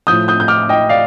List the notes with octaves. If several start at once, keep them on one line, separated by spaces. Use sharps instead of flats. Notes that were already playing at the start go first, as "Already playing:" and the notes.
A2 F3 D#6 G6
D#6 G6
G6
D6 F6
D#5 G5
D5 F5